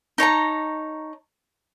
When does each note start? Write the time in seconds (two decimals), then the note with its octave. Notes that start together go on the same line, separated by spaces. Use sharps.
0.18 D#4 C#5 A5 A#5